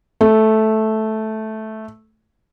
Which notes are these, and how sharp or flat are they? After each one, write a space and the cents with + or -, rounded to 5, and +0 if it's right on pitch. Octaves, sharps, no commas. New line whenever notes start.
A3 -10